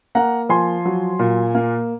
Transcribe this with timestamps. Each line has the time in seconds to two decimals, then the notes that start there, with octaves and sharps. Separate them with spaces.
0.15 A#3 F#5 A#5
0.49 F3 G#5 C6
0.85 F#3
1.19 A#2
1.55 A#3